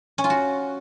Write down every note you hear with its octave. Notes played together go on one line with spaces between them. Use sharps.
C#4
F4
F#4